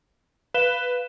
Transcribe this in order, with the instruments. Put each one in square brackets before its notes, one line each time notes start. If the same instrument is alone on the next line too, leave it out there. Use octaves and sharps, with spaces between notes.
[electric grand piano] B4 [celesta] F5 E7 G7